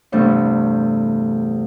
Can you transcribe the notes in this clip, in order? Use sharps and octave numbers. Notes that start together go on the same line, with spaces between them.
E2 G2 C3 A3 B3 D4